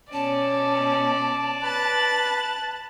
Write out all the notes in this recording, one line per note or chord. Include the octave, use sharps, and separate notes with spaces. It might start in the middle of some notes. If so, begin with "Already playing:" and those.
B2 C#4 D5 A5
B4 F#6 A6